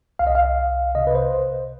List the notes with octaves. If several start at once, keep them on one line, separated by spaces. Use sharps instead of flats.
C2 F5
D#5
F5
C2
C3 D#5
B4
C5